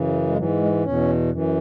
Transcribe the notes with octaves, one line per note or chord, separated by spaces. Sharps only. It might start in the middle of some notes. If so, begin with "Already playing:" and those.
Already playing: F#2 C#3 E3
G#3
G#2 E3 F#3
G#3
E2 B2 C#4
F#2 E3